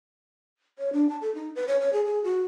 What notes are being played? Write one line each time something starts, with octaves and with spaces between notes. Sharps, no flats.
C#5
D4
A5
A4
D#4
B4
C#5
C#5
G#4
G#4
F#4